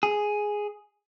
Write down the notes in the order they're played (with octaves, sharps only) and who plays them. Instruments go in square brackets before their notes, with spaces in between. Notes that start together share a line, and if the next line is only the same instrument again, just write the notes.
[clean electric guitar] G#4